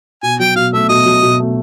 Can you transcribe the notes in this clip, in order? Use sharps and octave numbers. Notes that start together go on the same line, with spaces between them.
B2 G#5
F#3 G5
B2 F5
A3 E5
B2 D#5
F#3
B2
A3